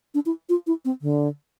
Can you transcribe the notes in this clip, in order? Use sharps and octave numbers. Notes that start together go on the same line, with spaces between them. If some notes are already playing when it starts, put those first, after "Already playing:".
D4
E4
F4
E4
C4
D3